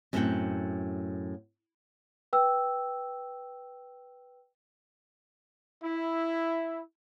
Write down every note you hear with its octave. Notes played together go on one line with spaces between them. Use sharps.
F#2 A2 C4 D#4 F#5 G5
B4 G5 E6
E4